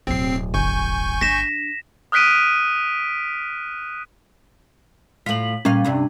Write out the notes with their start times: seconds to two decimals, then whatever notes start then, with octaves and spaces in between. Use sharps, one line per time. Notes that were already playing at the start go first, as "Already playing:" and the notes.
0.07 D1 B2 C4 C7
0.54 G1 G#5 C#6 G6
1.21 D4 A#6 B6 E7
2.12 D#6 F6 F#6 B6 D7 D#7
5.26 A2 F4 B6 F#7
5.65 A#2 G3 C#4 F5
5.84 G2 C3 D4